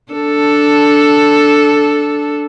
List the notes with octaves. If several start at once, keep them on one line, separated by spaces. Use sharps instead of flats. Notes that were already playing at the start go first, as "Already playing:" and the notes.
D4 A4